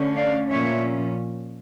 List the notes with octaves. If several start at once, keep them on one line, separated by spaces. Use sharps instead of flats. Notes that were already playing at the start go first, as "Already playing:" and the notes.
Already playing: D3 A3 C#4
D5 F5
A#2 F3 C#4 C#5 E5